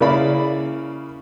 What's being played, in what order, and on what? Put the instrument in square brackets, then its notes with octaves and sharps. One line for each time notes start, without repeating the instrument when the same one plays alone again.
[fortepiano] C#3 A#3 E4 D5 B5